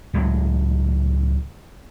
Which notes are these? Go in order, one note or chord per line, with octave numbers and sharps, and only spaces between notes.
C#2 A2 F#3